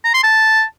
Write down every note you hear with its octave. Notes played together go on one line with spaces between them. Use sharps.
A#5
C6
A5